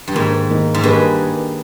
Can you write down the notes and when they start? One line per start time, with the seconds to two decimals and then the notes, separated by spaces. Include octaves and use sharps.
0.08 G2
0.15 G#2 D#3 A#3 D#4 A#4
0.49 D#3 A#3 D#4 A#4
0.74 G#2
0.84 G2 A#3 D#4 G#4 B4